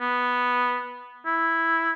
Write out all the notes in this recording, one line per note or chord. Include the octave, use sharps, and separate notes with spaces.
B3
E4